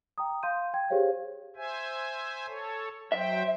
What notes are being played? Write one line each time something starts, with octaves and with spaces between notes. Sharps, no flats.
G5 A#5 D#6
F5 C6 G6 D#7
G5 G#6
G4 G#4 C5 C#5 F5
C5 E5 G#5
A4 C#5
F#3 C5 E5 G5